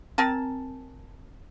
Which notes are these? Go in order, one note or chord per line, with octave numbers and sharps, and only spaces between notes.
C4 A#4 G#5 A5